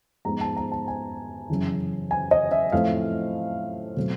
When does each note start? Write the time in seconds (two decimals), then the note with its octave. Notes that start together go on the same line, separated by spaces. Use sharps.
0.25 G#2 F3 G#3 B3 A#5
0.41 A5
0.57 A#5
0.72 A5
0.88 G#5
1.50 F#2 C#3 E3
2.11 G#5
2.31 D#5
2.51 E5
2.72 A2 F3 A3 C4 F5
3.96 B2 F#3 A3 C4